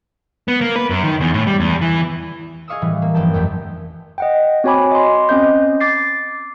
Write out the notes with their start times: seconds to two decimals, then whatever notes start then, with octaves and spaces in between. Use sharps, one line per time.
0.48 B3
0.61 A#3
0.76 B4
0.90 F#2
1.04 D#3
1.21 E2
1.34 A2
1.47 G3
1.60 E2
1.81 E3
2.68 G#4 D#5 F5 C#6 D#6 E6
2.81 A2 E3 G3
3.02 A#3
3.14 G1 F3 G5 A5
3.33 A1 F2 F#3 A3 G4
4.18 D#5 F#5 G5
4.64 C4 F#4 C#5 G#5 B5 D6
4.92 D#5 C6
5.29 C4 C#4 D#5 G6
5.80 D6 A6 C7